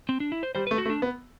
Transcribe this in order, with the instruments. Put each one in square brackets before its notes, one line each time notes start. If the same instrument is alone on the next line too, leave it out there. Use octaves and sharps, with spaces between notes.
[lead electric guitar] C4
D4
E4
C5
[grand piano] G3 [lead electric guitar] C5
[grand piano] A3 [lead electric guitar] B4
[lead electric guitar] F#4
[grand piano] A3
[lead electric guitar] D4
[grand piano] B3